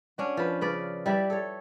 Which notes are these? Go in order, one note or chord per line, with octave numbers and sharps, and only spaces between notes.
C#4 D4 F#4
F3 B4
C#3 B4 D5
G3 E4 B4 D5
A4 C#5